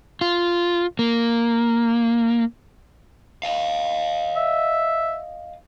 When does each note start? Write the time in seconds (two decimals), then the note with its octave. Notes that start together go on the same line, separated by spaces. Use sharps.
0.21 F4
0.99 A#3
3.43 D#5 F5
4.36 E5